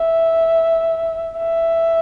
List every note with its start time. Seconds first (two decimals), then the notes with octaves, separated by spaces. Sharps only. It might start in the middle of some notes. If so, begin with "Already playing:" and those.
Already playing: E5
1.38 E5